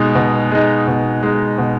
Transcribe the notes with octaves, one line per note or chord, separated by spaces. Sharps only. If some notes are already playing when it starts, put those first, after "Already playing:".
Already playing: B2 G#3 D#4
B2
G#3 D#4
B2
G#3 D#4
B2